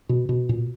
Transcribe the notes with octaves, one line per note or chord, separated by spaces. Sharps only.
B2
B2
A#2